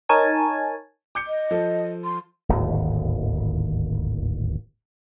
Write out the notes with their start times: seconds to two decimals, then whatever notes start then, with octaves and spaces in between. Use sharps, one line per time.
0.09 D#4 A#4 C#5 G#5 A5
1.15 D6 G6 C#7
1.27 D#5
1.51 F3 A4
2.04 C6
2.49 D1 G#1 D#2